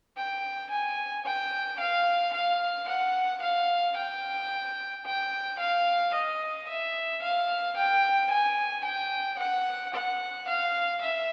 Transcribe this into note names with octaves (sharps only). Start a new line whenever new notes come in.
G5
G#5
G5
F5
F5
F#5
F5
G5
G5
F5
D#5
E5
F5
G5
G#5
G5
F#5
F#5
F5
E5